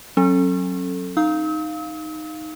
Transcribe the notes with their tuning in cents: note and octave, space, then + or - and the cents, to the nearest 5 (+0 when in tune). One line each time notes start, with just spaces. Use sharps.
F#3 +0 C#4 -35 A4 +0
D#4 +0 F5 +0 E6 -45